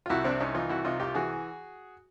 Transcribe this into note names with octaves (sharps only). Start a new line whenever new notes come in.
F4
C2 E4 F#4
C3 C4 D4
C2 C#4 D#4
E3 D#4 F4
C2 E4 F#4
C3 D#4 F4
C2 F4 G4
E3 F#4 G#4